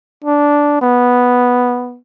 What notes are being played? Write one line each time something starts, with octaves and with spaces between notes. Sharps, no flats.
D4
B3